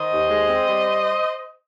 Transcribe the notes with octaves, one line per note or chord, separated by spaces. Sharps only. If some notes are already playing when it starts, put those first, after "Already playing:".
Already playing: D#3 C5 D#5
D#2
G#3
C4
G3